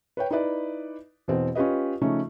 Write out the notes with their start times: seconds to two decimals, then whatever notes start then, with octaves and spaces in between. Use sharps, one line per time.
0.17 B4 C#5 G5
0.31 D#4 E4 B4 D5
1.28 E2 B2 C4
1.55 C#4 F4 G4 B4 D#5
2.01 C#3 F3 A3 C#4 D#4